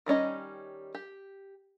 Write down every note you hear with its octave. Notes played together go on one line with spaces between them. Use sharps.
D#3 G3 C#4 D#5
G4